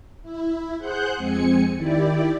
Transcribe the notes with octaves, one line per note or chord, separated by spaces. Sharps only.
E4
G#4 C5 F#5 F#6 G6
F2 G#3 C4 G#5 C#7
D#3 E4 G4 D5